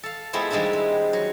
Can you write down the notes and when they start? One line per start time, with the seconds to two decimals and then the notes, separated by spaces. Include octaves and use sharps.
0.03 A4 F5
0.33 G#3 A3 B3 C4 E4 F4
0.51 D#3 G3 G#3 A#3 D4 E4
0.73 C4
1.13 F#3